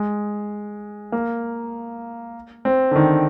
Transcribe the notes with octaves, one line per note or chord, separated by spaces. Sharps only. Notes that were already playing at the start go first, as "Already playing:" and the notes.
Already playing: G#3
A#3
C4
D3
D#3